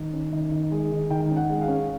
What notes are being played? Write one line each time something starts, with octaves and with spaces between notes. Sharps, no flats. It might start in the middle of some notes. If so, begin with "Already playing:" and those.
Already playing: D#3
C#4
D#3
D#3
G#3
D#3
D#3 G5
C#4
F#5
G#3
F5
C#4